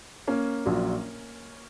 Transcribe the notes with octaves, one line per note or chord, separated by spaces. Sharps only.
A#3 C#4
A#1 A#2 F#3